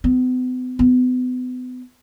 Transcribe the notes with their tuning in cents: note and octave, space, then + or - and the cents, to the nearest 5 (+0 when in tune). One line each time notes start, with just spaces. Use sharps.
B3 +45
B3 +35